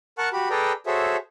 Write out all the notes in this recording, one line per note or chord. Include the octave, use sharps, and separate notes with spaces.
A#4 F#5 A5 C#6 F#6
F#4 G4 B5
G#4 A4 B4 D5 G5 A#5
F#4 G#4 A4 C5 C#5 E5